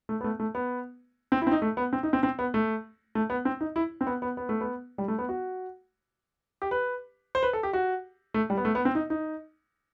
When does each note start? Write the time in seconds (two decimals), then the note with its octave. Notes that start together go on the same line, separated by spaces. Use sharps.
0.09 A3
0.21 B3
0.24 A3
0.40 A3
0.55 B3
1.32 C4
1.42 E4
1.47 C4
1.51 D#4
1.62 A3
1.77 B3
1.93 C4
2.03 D#4
2.13 C4
2.23 C4
2.39 B3
2.54 A3
3.15 A3
3.30 B3
3.45 C4
3.61 D#4
3.76 E4
4.01 C4
4.07 B3
4.22 B3
4.37 B3
4.49 A3
4.61 B3
4.98 G3
5.08 A3
5.19 B3
5.29 F#4
6.62 G4
6.71 B4
7.35 C5
7.43 B4
7.53 A4
7.63 G4
7.73 F#4
8.34 A3
8.50 G3
8.57 B3
8.65 A3
8.75 B3
8.85 C4
8.95 D#4
9.10 D#4